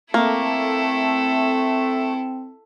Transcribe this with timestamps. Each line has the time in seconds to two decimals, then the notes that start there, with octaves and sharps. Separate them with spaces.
0.14 A3 A#3 C4 E4 A4